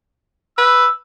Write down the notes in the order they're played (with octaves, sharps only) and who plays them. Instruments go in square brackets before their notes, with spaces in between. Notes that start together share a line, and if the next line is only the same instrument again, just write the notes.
[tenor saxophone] B4 [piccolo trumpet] E6